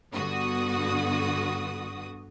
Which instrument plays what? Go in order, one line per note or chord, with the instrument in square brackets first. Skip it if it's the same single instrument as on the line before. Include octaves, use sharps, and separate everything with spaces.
[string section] G2 D3 B3 F#4 D#6